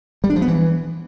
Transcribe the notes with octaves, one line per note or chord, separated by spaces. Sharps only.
G3
D4
F3
B3
E3